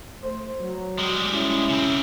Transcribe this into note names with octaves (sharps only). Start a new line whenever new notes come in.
A3 C5
F#3
G3 G#3
C#4 E4
C#3 C4